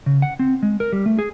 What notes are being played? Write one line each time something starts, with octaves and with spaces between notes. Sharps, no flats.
C#3
F#5
C4
G#3
A#4
G3
A3
G#4